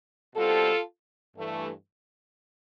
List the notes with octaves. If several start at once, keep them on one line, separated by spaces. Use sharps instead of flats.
B2 G3 C4 F4 A4
G2 E3 A3